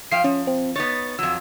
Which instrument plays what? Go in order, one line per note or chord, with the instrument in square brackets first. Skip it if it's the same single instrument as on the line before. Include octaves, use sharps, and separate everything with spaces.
[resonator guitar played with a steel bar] F3 F5 G5 [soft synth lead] C7
[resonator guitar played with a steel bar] F3 [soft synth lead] C#4
[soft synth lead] C4
[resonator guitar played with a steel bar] B3 D#4 C#5 [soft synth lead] A6
[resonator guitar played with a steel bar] F2 F#3 [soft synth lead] E6